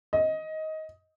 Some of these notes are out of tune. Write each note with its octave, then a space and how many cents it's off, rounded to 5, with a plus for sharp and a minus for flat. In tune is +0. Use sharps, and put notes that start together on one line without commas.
D#5 +15